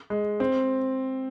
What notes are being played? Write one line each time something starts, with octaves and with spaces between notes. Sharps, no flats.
G#3
C4